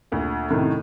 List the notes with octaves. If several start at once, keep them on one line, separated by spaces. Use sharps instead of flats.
D2 A#2 D3
F#2 A2 C3 D#3